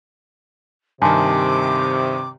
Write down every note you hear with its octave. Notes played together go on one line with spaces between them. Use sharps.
G2 C3 D#3 G#5 A5 C6 D6